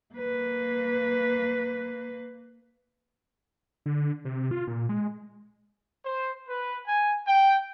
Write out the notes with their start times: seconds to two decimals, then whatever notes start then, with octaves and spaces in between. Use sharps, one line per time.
0.14 A#3 B4
3.86 D3
4.25 C3
4.51 F4
4.67 A#2
4.89 G#3
6.04 C5
6.48 B4
6.87 G#5
7.27 G5